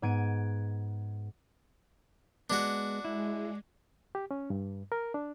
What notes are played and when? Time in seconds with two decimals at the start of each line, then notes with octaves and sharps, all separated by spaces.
0.02 G#2 B3 G#6 D7 D#7
2.50 G#3 B3 D4 F#4
3.05 G#3 E4
4.15 G4
4.31 C#4
4.50 G2
4.92 A#4
5.14 D4